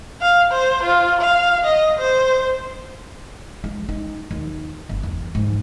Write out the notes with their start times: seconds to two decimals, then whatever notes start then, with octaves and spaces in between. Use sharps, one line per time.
0.21 F5
0.51 C5
0.83 F4
1.21 F5
1.65 D#5
1.99 C5
3.64 G#3
3.89 D#4
4.31 D#2
4.89 G1
5.03 E2
5.35 G#2